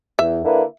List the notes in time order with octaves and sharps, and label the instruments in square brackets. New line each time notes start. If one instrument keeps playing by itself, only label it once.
[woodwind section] E2 [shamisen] E5
[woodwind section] D3 A#3 E4 B4